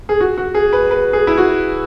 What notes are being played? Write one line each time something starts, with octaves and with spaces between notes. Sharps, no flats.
G#4
F#4
F#4
G#4
B4
B4
G#4
E4
F#4